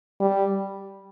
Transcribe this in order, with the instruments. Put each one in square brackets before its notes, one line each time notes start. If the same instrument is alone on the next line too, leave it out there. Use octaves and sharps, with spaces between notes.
[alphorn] G3